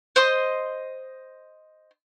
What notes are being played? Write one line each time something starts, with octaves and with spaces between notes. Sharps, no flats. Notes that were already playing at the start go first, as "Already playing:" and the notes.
C5 D#5 C6